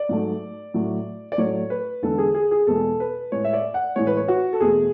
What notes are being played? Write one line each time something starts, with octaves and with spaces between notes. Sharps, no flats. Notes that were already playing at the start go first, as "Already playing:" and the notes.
Already playing: D5
G#2 F#3 A3
A2 F#3 A3
D5
A2 F#3 A3 C#5
B4
E2 D3 G#3 A4
G#4
G#4
G#4
E2 B2 G#3 A4
B4
A2 G#3 C#5
E5
D5
F#5
A2 E3 G#3 C#5
B4
C#5
F#4
A4
E2 B2 A3 G#4